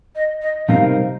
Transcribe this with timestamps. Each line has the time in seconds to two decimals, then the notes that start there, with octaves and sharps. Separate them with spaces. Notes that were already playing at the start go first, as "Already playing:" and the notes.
0.15 D#5
0.42 D#5
0.68 C3 G3 C4 D#4 A#4 F5